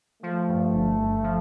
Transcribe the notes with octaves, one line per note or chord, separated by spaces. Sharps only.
F3 A3
G2
G1
G1
F3